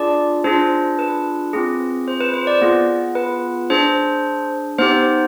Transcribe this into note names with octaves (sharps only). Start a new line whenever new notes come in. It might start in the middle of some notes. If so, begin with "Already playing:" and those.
Already playing: D4 F4 G#4 D5
D4 F4 G#4 C5
B4
C4 F4 G#4
C5
B4
C5
D5
B3 F4 G#4
B4
D4 G#4 C5
B3 D#4 G4 C5